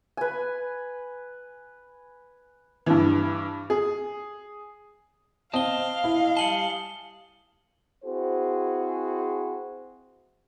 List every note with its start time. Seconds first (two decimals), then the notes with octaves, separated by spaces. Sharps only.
0.17 B4 G#5
2.86 G2 E3
3.70 G#4
5.54 C4 D#5 F5 A5 D#6 G7
6.04 E4
6.37 G3 G#5 A5 C#7 F#7 G7
8.04 C4 E4 F#4 G#4 C5